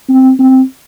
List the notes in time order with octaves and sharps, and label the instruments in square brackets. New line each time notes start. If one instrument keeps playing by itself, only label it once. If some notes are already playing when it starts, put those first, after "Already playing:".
[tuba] C4
C4